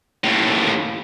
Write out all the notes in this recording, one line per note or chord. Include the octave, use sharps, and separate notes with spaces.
D#2 A2